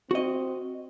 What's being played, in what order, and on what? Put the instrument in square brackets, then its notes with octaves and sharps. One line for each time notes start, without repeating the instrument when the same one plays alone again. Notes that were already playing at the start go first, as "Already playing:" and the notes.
[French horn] C4 [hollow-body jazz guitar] F#4 D#5